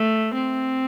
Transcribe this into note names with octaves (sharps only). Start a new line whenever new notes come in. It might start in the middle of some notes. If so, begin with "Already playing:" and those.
Already playing: A3
C4